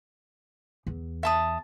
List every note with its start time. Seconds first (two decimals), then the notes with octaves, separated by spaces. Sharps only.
0.87 E2
1.23 E5 A5 D#6